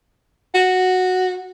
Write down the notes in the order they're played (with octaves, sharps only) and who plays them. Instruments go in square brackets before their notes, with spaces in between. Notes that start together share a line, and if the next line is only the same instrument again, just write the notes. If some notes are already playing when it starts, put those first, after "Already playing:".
[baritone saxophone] F#4